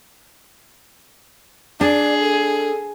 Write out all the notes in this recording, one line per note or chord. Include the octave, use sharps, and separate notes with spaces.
D4 G#4 D5
A4